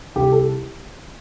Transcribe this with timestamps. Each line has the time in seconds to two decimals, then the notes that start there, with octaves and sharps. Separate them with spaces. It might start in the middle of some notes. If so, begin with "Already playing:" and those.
0.16 C2 G4
0.32 A4